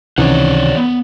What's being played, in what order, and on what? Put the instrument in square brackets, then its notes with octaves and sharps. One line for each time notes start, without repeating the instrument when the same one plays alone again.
[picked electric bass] C#2 C3 D#3 [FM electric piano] E3 C#4 [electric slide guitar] C#5 D5 F#5
[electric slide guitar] B3